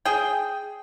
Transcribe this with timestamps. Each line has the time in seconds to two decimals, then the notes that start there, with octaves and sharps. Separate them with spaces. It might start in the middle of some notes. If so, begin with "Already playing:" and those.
0.05 G#4 G5